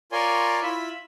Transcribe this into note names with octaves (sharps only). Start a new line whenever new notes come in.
F4 A#4 C#5 D5 G#5 C6
E4 F4 E5 B5